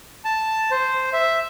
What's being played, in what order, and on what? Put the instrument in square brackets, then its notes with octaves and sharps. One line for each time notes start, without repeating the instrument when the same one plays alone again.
[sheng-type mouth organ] A5
C5
E5